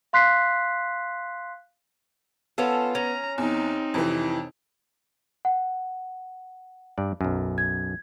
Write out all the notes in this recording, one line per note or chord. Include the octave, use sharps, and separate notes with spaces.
F5 C6 F#6 B6 C7
B3 C#4 F4 A4
C#4 A#5
E2 C4 D#4
F2 C3 E3
F#5
G2 D5
B1 F#2
G#6